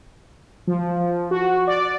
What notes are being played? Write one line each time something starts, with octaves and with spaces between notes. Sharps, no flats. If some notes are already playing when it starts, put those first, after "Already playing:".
F3
F#4
D5